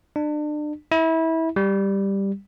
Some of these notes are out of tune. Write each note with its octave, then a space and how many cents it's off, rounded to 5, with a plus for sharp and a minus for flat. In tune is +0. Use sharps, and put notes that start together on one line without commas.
D4 +35
E4 -25
G3 +5